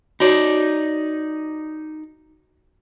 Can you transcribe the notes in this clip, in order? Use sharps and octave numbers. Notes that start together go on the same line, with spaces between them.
D#4 F#4 C#5 D5